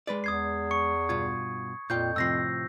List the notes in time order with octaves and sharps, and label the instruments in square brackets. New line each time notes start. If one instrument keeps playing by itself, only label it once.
[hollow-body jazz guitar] G#3 B4 D5
[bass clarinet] E2 [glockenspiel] D#6 G#6 C7
[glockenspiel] C#6 C#7
[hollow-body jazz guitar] G2 B2 F4 [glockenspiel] G#6
[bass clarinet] F2 [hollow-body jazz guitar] A#2 F4 G5 [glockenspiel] G6
[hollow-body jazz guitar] A2 C3 F3 [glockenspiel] E6 A#6 C7